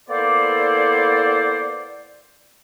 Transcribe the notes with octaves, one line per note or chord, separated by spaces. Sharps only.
A#3 B3 E4 A4 C5 D5